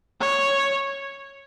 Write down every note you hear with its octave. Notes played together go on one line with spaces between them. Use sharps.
C#5